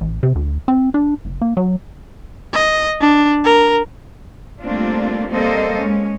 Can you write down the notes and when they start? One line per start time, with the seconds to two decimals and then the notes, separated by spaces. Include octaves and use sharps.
0.01 A1
0.23 C3
0.35 D2
0.68 C4
0.94 D4
1.25 F#1
1.41 A#3
1.57 F#3
2.53 D#5
3.01 D4
3.44 A#4
4.61 G3 A3 A#3 C4 D4 F4
5.31 G3 A#3 C4 A4 C5 D#5
5.79 G#3 C#4